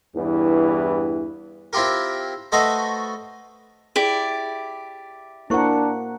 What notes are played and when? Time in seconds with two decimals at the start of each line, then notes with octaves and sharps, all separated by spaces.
0.16 E2 G2 E3 E4
1.73 C4 E4 F4 G4 A#4
2.52 A3 F#4 A4 B4 C5 D#5
3.96 E4 G4 G#4 D5
5.50 A#3 D4 E4 A#4 C5 F#5 C#6